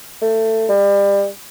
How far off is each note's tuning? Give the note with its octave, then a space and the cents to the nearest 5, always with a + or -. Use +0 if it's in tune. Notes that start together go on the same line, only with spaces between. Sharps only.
A3 +20
G3 +30